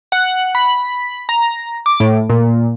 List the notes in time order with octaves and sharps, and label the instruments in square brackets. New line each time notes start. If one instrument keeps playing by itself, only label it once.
[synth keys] F#5
B5
A#5
D6
A2
A#2